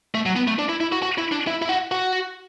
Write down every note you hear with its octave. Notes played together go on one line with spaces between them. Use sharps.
A3
F#3
B3
A3
D4
E4
E4
F#4
F#4
E4
D4
E4
E4
F#4
F#4